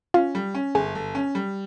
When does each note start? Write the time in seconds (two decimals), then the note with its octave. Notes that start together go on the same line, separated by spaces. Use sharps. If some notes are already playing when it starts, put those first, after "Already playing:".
0.14 C#4 F4
0.35 G3
0.55 C#4
0.75 G1 G#4
0.95 G1
1.15 C#4
1.35 G3